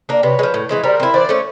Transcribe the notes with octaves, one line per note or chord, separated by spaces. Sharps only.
A#3 D4
C3 B4 C#5
G#3
F3
A2
E3 G#3 C4
G3 A#4 C5
C4 E4
E3 C5 D5
A3 C#4